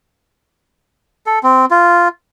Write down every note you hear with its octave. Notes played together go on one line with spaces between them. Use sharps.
A4
C4
F4